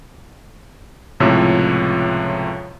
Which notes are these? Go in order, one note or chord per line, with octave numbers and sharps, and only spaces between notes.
C#2 A2 C3 F3 C#5 E6